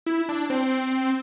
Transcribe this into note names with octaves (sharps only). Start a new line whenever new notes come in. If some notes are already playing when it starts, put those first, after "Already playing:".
E4
D4
C4